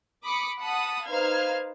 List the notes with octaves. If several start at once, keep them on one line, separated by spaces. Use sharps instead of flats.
B5 D6 D#6 C#7
F#5 A5 B5 D#6
D#4 B4 C5 F5 F6 G#6